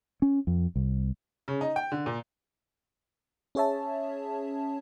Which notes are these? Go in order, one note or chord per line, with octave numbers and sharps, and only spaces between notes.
C#4
F2
C2
C#3
D#4
G5
D3
A#2
C#4 G#4 C#5 E5 A5